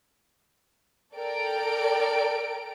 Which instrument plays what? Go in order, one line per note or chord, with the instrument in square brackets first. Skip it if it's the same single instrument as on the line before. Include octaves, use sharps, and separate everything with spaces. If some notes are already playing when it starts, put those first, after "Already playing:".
[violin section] A4 A#4 D5 G5 A#5 D7